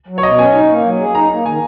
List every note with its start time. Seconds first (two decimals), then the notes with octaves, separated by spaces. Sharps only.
0.08 F#3
0.18 C#5
0.23 B2 D#5
0.38 C#4 G#5
0.53 D#4
0.69 A#3
0.84 F#3
0.99 G#4
1.14 D#4 A#5
1.31 A#3
1.45 D#3 G#5